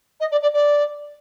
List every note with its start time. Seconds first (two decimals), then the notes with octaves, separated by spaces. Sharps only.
0.20 D#5
0.32 D5
0.42 D5
0.54 D5